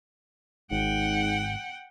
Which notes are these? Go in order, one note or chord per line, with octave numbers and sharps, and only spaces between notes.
G#1 G#2 F#5 G5